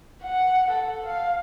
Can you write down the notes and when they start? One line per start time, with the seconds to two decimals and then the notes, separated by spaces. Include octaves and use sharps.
0.25 F#5
0.71 A4
1.06 F5